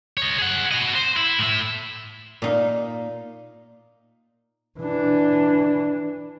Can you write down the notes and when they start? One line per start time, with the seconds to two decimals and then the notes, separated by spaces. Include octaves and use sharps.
0.17 C#5 D#5
0.38 G#4 F#5
0.71 F#4 D#5
0.95 C5
1.17 E4
1.39 A2 E5
2.42 A#2 D#4 F5
4.79 E3 D4